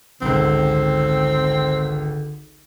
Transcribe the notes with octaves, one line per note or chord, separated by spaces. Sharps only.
G#1 C#2 D3 C4